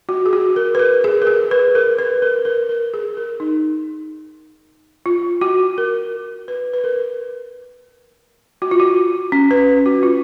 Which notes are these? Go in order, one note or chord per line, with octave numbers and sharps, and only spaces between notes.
F#4
G#4
F#4
A#4
B4
A#4
G#4
A#4
G#4
B4
A#4
B4
A#4
A#4
A#4
G#4
A#4
D#4
F4
F#4
A#4
B4
B4
A#4
F#4
F4
F#4
C#4
B4
F#4
F4